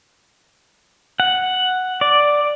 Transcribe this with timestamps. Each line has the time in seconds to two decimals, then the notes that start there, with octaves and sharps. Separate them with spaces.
1.20 F#5
2.01 D5